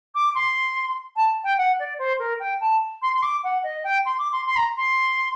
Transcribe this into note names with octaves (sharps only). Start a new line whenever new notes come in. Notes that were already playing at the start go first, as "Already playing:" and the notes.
D6
C6
A5
G5
F#5
D5
C5
A#4
G5
A5
C6
C6
D6
F#5
D#5
G5
C6
D6
C6
C6
A#5
C6